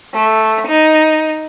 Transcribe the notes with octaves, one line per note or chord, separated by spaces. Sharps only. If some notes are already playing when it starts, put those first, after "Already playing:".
A3
D#4